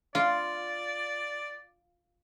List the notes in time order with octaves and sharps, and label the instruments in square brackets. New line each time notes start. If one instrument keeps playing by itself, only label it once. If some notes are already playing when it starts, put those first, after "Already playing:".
[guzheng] F4 [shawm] D5